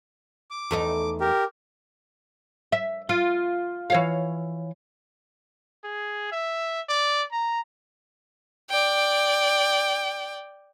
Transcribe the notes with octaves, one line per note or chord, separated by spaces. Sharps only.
D6
E2 A3 D#4
G4 A#4
E5
F4
E3 C#5 F5
G#4
E5
D5
A#5
D5 G5